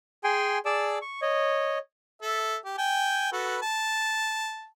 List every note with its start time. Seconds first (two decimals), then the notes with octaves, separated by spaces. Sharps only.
0.24 G#4 G5 G#5 C6
0.65 G#4 D5 A5 D6 E6
1.02 C#6
1.22 C#5 D#5
2.22 A4 E5
2.65 G4
2.78 G5 G#5
3.32 F#4 A4 B4
3.62 A5